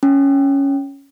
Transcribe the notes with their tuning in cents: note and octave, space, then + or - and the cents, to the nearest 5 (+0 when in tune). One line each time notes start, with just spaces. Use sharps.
C#4 +0